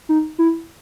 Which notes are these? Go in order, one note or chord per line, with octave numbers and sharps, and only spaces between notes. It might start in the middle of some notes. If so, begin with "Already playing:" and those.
D#4
E4